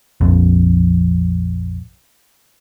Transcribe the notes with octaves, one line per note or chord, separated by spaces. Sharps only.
A#1 F2